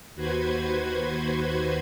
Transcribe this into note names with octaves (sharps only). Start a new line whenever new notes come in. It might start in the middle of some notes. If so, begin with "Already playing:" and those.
D#2 F#4 B4 C5 G#6